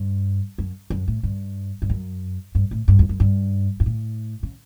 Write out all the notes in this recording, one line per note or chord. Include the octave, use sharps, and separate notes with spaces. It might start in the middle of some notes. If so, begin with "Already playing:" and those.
Already playing: G2
F#2
F#2
A2
G2
G2
F#2
G2
A2
G2
E2
F#2
G2
G2
A2
C#3